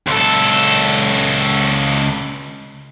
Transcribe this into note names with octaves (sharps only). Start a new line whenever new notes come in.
C#2 A4